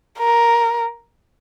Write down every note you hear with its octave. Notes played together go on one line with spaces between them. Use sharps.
A#4